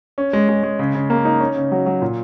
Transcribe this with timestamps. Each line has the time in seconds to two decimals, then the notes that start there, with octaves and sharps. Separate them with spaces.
0.18 C#4
0.33 G#3
0.49 G#3
0.63 G#3
0.79 C#3
0.95 C#3
1.10 A#3
1.25 D#4
1.40 C#4
1.56 C#3
1.72 F#3
1.86 F#3
2.02 A#2